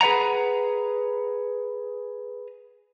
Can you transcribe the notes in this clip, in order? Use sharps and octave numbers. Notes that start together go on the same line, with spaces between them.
G#4 B4 D5 F#5 A#5